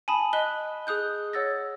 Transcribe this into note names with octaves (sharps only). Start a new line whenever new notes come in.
G#5 A5 B5 D#6
D#5 F#6 B6 G7
G#4 D#6 F#6 G6
C#5 F#5 E6 A6 A#6